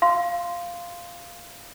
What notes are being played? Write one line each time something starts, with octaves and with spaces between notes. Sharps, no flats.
F5 C6